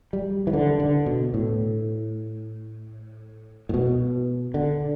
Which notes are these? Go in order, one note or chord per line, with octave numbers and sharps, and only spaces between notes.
G3
E3
D3
D3
B2
A2
A2
B2
D3